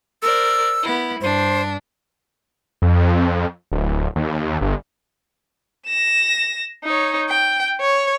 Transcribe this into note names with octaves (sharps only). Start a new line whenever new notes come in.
A#4 C5 D5 E6
B3 E4
G2 D4 C5
F2
D1
D#2
G1
A#6 E7
D#4 C#5
G5
C#5